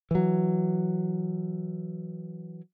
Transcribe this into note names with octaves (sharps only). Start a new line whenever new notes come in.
E3 F#3